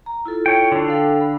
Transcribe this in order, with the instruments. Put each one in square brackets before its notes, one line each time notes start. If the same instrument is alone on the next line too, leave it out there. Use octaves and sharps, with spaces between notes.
[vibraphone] A#5
E4 F4 A4
[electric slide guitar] C#5 G5
D3 D4
[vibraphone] A4 F5 G5
B5